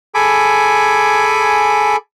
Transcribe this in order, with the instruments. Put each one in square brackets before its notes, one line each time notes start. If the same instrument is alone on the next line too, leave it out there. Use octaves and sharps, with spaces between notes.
[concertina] G#4 A4 G#5 B5 D6